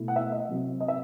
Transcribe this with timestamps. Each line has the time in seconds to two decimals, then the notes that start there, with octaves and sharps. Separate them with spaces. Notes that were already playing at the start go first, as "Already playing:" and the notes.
Already playing: B2 A3 E4
0.08 F#5
0.16 E5
0.32 D#5
0.49 C3 F#3 C4
0.80 D#5
0.88 E5